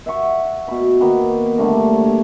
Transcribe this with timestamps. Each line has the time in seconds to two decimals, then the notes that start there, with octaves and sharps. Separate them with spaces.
0.06 E5 F#5 C#6
0.68 B2 B5
1.00 D#3 A#3 B3 G5
1.58 D3 G3 A3 A#3
1.98 C#5